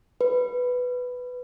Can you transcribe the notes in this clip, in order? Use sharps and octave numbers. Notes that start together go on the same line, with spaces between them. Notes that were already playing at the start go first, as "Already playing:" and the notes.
B4